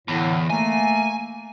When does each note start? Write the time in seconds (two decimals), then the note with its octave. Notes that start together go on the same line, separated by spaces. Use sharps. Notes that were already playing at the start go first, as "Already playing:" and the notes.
0.08 E2 A2 D3
0.50 A3 A#3 G#5